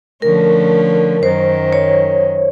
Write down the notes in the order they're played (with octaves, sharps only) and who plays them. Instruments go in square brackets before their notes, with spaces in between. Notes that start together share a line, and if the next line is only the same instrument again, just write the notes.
[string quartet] D3 F3 A3 C#4 [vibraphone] A#4
[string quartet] F#2 D#3 F#3 [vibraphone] C5
[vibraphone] C#5